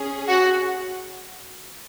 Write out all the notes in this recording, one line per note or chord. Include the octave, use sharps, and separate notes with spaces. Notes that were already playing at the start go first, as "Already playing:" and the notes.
Already playing: C#4 G#4
F#4 F#5